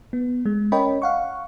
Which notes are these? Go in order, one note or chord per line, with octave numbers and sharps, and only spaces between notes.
B3
G#3
C#4 A#4 C#5 D#5 G5 B5
F5 F#5 C#6